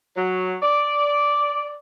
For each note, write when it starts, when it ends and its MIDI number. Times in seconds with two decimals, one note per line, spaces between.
0.16 0.54 54
0.61 1.72 74